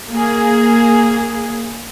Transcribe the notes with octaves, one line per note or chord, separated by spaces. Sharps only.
A#3 G#4